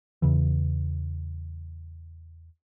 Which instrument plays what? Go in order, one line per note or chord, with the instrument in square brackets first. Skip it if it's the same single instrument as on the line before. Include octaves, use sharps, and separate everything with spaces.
[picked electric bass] E2 C#3 E3